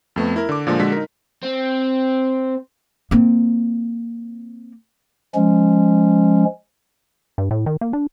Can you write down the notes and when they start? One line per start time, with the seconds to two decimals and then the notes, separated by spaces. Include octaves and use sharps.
0.16 F2 A3 B3
0.36 E4 A#4
0.49 D3 D6
0.67 A#2 D3 F3 G#3 A#3
0.79 D3 G#3 F#4 B6
0.92 D#4 A#4
1.43 C4
3.11 A#3 C4
5.35 F3 G#3 C#4
7.38 G2
7.51 A2
7.66 D#3
7.81 A#3
7.93 D4